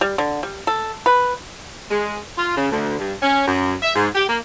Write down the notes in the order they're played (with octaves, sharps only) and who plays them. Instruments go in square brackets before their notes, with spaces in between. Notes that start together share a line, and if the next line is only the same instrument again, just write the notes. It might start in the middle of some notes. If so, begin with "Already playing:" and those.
[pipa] G3
D3
G3
A4
B4
[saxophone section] G#3
F4
C#3
D2
G2
C#4
F#2
E5
G#2
G4
A#3